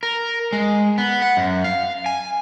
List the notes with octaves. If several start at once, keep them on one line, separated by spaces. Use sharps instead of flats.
A#4
G#3
B3
F#5
F#2
F5
G#5